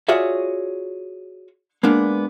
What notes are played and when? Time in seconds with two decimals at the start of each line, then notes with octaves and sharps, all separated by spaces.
0.09 F4 F#4 G#4 C#5 D5 E5
1.83 G#3 A#3 B3 D4